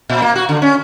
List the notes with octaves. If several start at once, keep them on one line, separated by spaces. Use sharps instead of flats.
A#2
A#3
F#4
D3
C#4